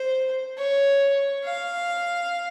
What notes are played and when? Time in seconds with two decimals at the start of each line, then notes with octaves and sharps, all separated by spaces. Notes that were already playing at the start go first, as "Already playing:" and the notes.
Already playing: C5
0.58 C#5
1.45 F5